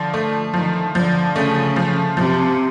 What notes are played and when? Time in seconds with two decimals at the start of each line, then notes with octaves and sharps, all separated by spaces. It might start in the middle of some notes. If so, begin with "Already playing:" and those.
Already playing: D3 F3
0.14 A3
0.54 D#3 F3
0.94 D3 F3
1.35 C#3 A3
1.76 F3
2.17 C3 F3